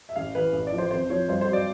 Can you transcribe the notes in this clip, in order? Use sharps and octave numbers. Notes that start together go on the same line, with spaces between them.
E5
A1 F5
E3 B4
A1
D5
F3
C5
F1 C5
F3 C#5
G2 C5
C5
F#3
D5